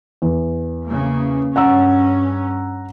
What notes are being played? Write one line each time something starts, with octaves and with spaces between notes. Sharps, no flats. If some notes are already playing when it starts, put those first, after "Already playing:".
E2
C#3 A#3
G2 C#4 F#5 A#5 E6